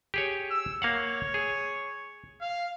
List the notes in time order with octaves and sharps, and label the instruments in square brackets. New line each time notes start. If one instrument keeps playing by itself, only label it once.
[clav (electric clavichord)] G4 G#4 C#5
[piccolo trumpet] E6
[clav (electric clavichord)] A#3 F5 F#5 [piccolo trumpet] C#5
[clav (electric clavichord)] G#4
[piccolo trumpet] F5